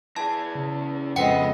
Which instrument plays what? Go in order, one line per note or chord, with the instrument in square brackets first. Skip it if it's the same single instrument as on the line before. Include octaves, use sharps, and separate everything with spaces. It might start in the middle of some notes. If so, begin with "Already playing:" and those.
[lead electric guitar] E3 G#4 [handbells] A5 [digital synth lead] G#6
[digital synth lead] C#3
[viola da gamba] F2 G#3 D#5 [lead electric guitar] B3 [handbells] F#5 G5 C#7